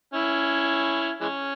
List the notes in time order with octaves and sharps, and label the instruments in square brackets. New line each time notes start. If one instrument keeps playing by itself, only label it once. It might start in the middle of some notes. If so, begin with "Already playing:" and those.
[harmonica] C#4 E4
E3 G#3 C#4